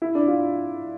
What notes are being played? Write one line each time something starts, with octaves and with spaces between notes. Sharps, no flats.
E4
D4
F4